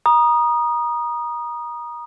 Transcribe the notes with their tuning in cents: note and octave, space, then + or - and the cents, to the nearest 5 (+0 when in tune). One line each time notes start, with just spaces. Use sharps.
A#5 +30 D#6 -15